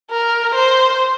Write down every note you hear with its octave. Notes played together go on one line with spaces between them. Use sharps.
A#4
C5